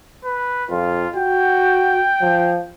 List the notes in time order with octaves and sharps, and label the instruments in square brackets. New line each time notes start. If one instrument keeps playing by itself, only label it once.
[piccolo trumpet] B4
[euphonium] F2 [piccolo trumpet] F4
[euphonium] F#4 [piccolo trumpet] G5
[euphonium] F3